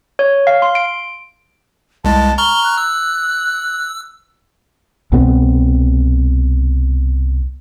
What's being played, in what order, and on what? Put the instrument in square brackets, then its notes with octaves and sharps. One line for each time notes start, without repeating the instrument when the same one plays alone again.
[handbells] C#5
F5
C6
D7
[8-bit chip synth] C2 G#3 [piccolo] A5
[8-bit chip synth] A#5 C#6 F6 [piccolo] G7
[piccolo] F#6
[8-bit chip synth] E6
[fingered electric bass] C2 B2 B3 C4